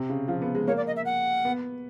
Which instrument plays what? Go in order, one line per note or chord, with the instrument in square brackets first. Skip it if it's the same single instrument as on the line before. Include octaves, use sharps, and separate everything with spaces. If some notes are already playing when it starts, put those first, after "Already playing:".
Already playing: [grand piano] C3
C#3
F3
B3
G#3
[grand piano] A#3 [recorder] C#5
[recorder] D5
D#5
E5
F#5
[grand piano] B3